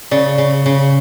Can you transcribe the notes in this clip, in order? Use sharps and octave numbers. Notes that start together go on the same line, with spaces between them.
C#3 D5
C#3
C#3